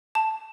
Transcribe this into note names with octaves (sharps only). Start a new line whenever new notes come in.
A5